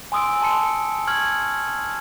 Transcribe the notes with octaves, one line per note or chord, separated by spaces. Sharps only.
G#5 C6 D#6 E6 D7
A5 C6 C#7
C#6 F6 G#6 F#7